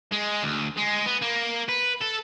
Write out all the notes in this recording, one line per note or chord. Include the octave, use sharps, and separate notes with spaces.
G#3
D2
G#3
B3
A#3
B4
A4